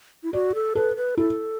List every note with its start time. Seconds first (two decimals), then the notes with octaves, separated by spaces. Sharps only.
0.23 E4
0.33 F#4 D5
0.55 A4
0.75 A4 B4
0.96 B4
1.17 E4 A4